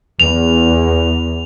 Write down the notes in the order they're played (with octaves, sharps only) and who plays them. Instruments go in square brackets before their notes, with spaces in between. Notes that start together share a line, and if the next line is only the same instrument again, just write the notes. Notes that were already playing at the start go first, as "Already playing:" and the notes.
[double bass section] E2 [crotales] F7